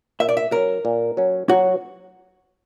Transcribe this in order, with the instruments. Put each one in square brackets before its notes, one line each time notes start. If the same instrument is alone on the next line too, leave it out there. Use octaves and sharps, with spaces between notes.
[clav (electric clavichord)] A#2 [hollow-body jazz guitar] E5
[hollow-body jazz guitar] D5
E5
[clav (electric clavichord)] F#3 C#4 [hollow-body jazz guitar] A#4
[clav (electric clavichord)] A#2
F#3 C#4
[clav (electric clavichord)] F#3 [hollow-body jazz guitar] F#4